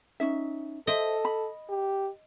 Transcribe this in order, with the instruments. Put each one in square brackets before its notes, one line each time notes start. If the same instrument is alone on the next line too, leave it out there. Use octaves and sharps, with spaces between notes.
[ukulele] C#4 D#4 E5
[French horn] A4 [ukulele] C5 E5 [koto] D#5
[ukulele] B5
[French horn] G4